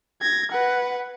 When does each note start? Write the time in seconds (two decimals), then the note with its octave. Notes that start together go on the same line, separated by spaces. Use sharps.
0.22 G#6 A#6
0.51 B4 F#5